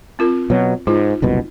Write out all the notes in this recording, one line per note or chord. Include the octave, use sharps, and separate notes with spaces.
C4 F4 A#4
B2 F#3
G#2 D#4 F4
F#1 C2 B2